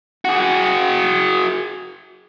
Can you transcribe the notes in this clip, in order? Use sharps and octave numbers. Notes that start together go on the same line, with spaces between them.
F#4 G#4